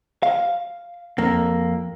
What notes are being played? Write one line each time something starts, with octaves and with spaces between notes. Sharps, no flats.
F5
F2 A#3